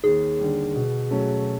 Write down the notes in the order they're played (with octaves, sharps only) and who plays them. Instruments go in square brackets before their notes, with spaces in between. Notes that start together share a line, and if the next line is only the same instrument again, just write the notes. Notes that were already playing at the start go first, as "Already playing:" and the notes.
[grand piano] D#2 [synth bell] G#4
[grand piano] D3 G3
B2
F#3 A3 C#4